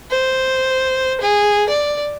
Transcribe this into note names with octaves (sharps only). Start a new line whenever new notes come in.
C5
G#4
D5